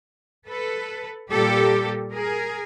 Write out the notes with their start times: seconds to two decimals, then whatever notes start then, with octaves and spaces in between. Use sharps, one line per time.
0.48 A4 B4
1.30 A#2 G3 A#3 G4 A4
2.13 G#4 A#4